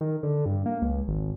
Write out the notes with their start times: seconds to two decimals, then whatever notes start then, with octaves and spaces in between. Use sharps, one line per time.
0.01 D#3
0.23 D3
0.46 G2
0.66 A#3
0.82 C#2
1.08 G#1